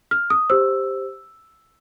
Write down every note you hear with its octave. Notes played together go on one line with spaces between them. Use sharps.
F6
D#6
G4 C5 E6